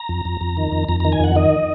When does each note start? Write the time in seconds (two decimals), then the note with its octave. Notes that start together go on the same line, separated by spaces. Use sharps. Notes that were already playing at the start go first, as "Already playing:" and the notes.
Already playing: A#5
0.09 F2
0.25 F2
0.41 F2
0.57 D#3
0.72 F2
0.88 F2 A#5
1.00 D#3 A#5
1.12 G#5
1.20 F2 F#5
1.36 D#3 D#5